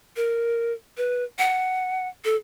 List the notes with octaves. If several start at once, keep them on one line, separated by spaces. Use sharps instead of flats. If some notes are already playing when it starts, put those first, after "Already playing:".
A#4
B4
F#5
A4